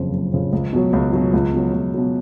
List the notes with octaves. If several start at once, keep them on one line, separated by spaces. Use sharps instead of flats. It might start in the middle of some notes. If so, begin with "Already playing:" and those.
Already playing: F#1 F2 C#3 F3
F#1
F2 C#3 F3
C#2
B2 F#3
C#2
B2 F#3
C#2
B2 F#3
C#2
B2 F#3